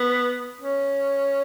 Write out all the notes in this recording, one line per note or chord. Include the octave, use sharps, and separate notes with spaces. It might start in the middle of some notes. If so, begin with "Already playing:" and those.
Already playing: B3
C#4